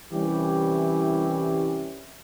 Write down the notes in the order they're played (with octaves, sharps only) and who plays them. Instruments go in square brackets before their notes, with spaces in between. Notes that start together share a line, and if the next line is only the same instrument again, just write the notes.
[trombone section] C2 E3 G3 C#4 E4 G4